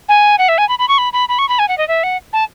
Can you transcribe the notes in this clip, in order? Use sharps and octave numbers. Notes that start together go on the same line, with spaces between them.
G#5
F#5
E5
G#5
B5
B5
C#6
B5
B5
B5
C#6
B5
G#5
F#5
D#5
E5
F#5
A5